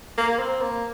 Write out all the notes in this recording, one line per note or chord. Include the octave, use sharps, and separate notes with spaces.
A#3
C4
A#3